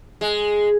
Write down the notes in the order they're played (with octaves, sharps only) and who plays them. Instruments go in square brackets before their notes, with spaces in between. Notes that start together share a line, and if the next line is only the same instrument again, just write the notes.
[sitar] G#3